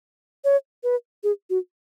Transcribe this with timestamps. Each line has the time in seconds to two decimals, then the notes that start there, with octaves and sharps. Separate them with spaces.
0.44 C#5
0.83 B4
1.24 G#4
1.50 F#4